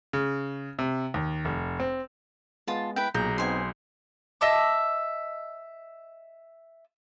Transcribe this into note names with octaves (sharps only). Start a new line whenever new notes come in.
C#3
C3
D#2
F1
C4
G#3 B3 F4 A5
E4 B4 G5
B1 A#2 G#4 A#5 G6
B3 C4 D#4 G#5 C6
D#5 E5 A5 D6